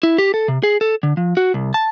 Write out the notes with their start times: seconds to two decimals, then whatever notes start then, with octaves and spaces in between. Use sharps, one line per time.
0.03 E4
0.18 G4
0.34 A4
0.48 C3
0.63 G#4
0.81 A4
1.03 D3
1.17 F3
1.37 F#4
1.54 C2
1.74 A5